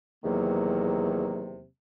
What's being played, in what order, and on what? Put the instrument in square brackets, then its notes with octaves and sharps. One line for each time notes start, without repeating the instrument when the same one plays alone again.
[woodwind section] E2 C3 D#3 F#3 A#3